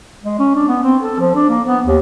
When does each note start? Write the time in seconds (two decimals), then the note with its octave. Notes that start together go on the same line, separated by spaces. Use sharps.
0.24 G#3
0.39 C#4
0.55 D4
0.68 B3
0.83 C4
1.03 A4
1.19 F3
1.35 D4
1.49 A#3
1.67 B3
1.87 D#2